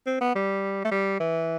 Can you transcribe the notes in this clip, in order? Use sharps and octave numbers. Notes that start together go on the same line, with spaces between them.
C4
B3
G3
A3
G3
E3